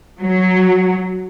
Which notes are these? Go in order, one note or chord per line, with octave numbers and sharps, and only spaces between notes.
F#3